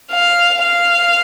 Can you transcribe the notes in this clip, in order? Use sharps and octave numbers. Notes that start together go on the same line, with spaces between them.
F5
F5